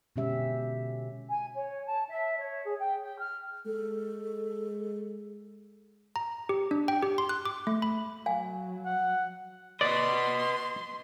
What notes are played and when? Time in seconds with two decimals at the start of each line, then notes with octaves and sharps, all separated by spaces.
0.16 B2 D3 G#3 C#4 G4 E5
1.29 G#5
1.53 C#5
1.87 A5
2.09 E5
2.38 C#5
2.65 G#4
2.78 G5
3.02 G5
3.19 F6
3.66 G#3 A4
6.16 A#5
6.49 G4
6.71 D4
6.88 G5
7.03 G4
7.18 C6
7.29 F#6
7.45 D6
7.67 A3
7.82 B5
8.26 F#3 F5 G#5
8.86 F#5
9.81 B4 D5 D#5 C6